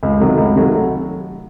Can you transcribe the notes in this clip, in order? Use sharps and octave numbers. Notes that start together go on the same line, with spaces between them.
C#2
C3 D#3 F#3 A3
C#2
C3 D#3 F#3 A3